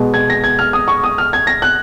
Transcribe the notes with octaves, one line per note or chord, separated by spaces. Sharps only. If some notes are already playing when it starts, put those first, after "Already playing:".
Already playing: B2 G#3 B3
G#6
A#6
G#6
F6
D#6
C#6
D#6
F6
G#6
A#6
F#6